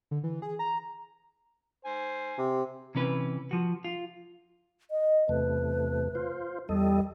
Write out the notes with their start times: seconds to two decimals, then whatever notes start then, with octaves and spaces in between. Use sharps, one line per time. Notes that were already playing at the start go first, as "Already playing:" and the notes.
0.11 D3
0.24 E3
0.42 G#4
0.59 A#5
1.85 C5 G#5
2.38 C3
2.95 C3 E3 C#4 B4
3.51 F3 F#4
3.84 F4
4.91 D#5
5.29 E2 C3 A3 B4
6.15 F4 C5
6.69 E2 G3 A4 D#5